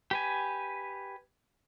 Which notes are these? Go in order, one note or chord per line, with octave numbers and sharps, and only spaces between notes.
G4 B4 G#5